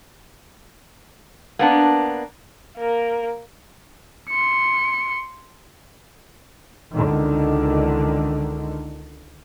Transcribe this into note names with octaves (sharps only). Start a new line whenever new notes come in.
A#3 B3 D4
A#3 A#4
C6 C#7
C#2 D3 D#3